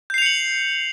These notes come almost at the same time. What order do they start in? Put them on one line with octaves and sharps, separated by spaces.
G6 C7 F7 C#7 F#7